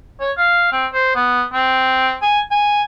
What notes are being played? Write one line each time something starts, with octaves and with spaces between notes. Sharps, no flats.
C#5
F5
C4
C5
B3
C4
G#5
G#5